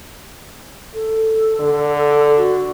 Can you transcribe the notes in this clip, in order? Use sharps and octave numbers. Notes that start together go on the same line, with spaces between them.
A4
D3
F#4